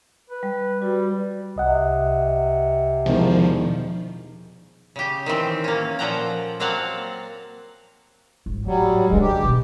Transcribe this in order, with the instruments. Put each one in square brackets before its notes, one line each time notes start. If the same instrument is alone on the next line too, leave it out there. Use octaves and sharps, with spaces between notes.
[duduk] B4
[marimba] G3
[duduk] G3 [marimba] F#4 B4
[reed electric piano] C2 D#5 F#5 [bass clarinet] C3
[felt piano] E1 D#3 [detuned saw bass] F3
[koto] C#3 G4
D#3 E3 C4
A#3 C#4
A#2 F3 A4 F#5 G5 A#5
F#3 A#3 C4 F5 F#5 A5
[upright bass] G#1
[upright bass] A2 [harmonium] F#3 G3
[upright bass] D#1 D#3 [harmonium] G2 G#3
[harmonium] G4
[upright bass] B2